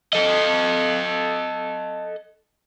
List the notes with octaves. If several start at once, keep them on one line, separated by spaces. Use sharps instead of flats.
A4 D#5